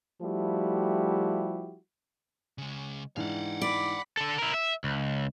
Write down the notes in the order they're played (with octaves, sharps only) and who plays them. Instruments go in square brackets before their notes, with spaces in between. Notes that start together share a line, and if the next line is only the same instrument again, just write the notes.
[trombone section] F3 G3 A3 E4 F#4 G4
[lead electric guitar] C#3 G#3
[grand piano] G#2 E3 D4 [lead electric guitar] F5 F#5
[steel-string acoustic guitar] D5 [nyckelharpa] B5 D6
[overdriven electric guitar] D3 A4
E4 A#4
E5
C#2